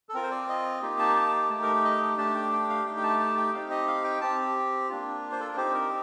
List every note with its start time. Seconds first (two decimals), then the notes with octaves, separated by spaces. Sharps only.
0.09 A4
0.14 C4 F4 A#4
0.23 C5
0.31 D5
0.49 D#5
0.82 A#3 D#4 G4
0.99 A5
1.16 A5
1.50 A3 D#4 G4 A5
1.62 A#4
1.85 D#5
2.18 A3 D4 G4 A5
2.35 G5
2.52 G5
2.69 F5
2.85 A3 D#4 G4 G5
2.97 G5
3.03 A5
3.20 A5
3.37 G5
3.54 C4 D#4 G4 F5
3.70 D#5
3.88 F5
4.04 G5
4.21 C4 G4 A5
4.90 A#3 D4 F4
5.32 C5
5.40 A4
5.49 A#4
5.57 C4 D#4 G4 C5
5.74 A#4